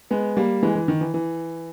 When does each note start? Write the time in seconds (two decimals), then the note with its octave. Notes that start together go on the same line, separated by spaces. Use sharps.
0.11 G#3 B3
0.37 G3 A#3
0.63 E3 G#3
0.75 E3
0.88 D#3
1.01 E3
1.14 E3